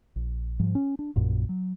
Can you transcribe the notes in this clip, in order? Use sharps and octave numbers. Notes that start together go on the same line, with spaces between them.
A#1
G#2 F3 G3
C#4
D4
A#1 F#2 A#2
F#3